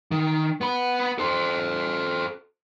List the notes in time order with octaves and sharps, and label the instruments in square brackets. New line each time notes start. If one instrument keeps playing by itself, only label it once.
[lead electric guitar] D#3
B3 B5
A4 C5